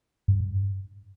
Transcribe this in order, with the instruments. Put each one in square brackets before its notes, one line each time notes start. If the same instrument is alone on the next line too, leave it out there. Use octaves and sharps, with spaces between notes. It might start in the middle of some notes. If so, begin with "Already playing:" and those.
[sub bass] G2